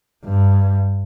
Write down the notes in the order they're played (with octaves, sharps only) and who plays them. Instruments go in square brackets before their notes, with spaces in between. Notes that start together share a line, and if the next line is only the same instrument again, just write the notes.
[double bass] G2